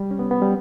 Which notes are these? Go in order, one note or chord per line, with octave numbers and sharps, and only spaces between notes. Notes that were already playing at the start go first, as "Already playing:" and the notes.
Already playing: G3
C#4
B3
B3
G3